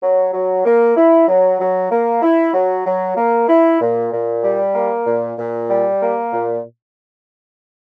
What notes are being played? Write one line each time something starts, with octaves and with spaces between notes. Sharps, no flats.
F#3
F#3
A#3
E4
F#3
F#3
A#3
E4
F#3
F#3
A#3
E4
A#2
A#2
G3
A#3
A#2
A#2
G3
A#3
A#2